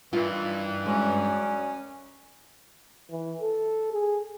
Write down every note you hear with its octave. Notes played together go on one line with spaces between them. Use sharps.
G2 D#3 E3 F4
F#2 G#3 C#4 D5
E3
A4
G#4